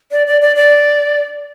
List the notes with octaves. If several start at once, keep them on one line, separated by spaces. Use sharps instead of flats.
D5
D5
D5
D5